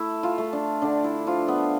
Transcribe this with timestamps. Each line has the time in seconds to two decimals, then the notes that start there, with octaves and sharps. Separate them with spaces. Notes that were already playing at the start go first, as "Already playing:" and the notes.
Already playing: A3 E4
0.23 F4
0.38 A3
0.53 D4
0.82 D3 D4
1.04 E4
1.26 F3 F4
1.48 B3